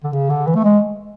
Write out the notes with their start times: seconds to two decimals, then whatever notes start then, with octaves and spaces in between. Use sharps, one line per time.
0.03 D3
0.12 C#3
0.30 D3
0.47 E3
0.55 A3
0.64 G#3